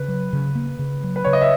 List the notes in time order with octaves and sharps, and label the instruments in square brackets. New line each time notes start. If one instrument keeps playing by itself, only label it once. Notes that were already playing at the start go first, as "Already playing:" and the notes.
Already playing: [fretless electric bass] C#3 [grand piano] B4
[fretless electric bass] F#3
C#3
A#3
C#3
F#3
[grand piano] B4
[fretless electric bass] C#3 [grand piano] C#5
[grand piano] D#5
E5